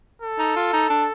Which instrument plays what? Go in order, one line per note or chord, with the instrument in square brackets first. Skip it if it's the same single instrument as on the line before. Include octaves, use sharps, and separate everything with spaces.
[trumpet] A4
[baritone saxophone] D#4
F4
D#4
D4